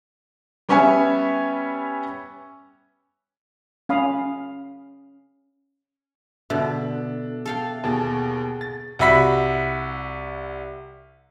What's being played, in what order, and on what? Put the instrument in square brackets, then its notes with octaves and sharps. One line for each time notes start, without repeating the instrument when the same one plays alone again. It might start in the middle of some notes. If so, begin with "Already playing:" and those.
[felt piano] G3 B3 C#4 C#5 E5 G#5
[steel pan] C#4 F5 B5 D#6
[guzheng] B2 D3 [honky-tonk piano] D4 [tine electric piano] E5
[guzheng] A4 F5 G5
[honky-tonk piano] D#2 B2 A6 [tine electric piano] G#4 A5
[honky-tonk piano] A6
[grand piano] C2 F#4 E5 B5 B6